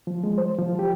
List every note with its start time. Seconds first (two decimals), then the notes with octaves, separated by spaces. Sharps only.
0.07 F3
0.24 G#3
0.38 C5
0.59 F3
0.79 G4